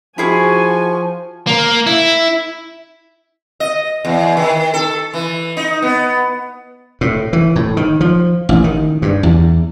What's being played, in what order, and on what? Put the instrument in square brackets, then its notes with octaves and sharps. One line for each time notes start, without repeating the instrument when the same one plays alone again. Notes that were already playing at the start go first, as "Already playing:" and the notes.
[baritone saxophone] F3 [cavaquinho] E4 G#4 C#6 [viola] F#4 G#5
[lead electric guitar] A#3
E4
[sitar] D#5
E2
D#3
A4
E3
D#4
B3
[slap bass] A2
E3
A2
D#3
F3
A1
D#3
G2
E2